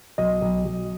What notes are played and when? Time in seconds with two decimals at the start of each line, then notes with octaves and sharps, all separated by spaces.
0.18 B1 D#5
0.41 B1
0.65 B1